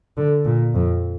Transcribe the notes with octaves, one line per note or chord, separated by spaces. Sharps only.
D3
A#2
F2